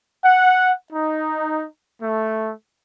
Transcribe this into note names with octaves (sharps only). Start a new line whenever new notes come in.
F#5
D#4
A3